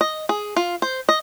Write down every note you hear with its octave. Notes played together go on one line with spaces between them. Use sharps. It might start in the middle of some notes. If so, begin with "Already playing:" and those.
D#5
G#4
F4
C5
D#5